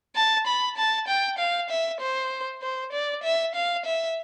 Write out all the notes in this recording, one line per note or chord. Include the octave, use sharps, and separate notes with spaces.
A5
B5
A5
G5
F5
E5
C5
C5
D5
E5
F5
E5